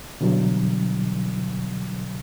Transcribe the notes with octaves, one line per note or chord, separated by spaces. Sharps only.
B2 D3 E3 F#3 G3